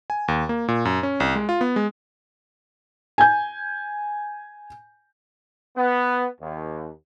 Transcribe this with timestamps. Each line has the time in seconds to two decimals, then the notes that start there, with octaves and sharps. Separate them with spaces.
0.10 G#5
0.28 D#2
0.49 A#3
0.68 A#2
0.85 F#2
1.03 C#4
1.20 C2
1.35 G#3
1.49 F4
1.61 B3
1.76 G#3
3.18 G#5 G6
5.77 B3
6.41 D#2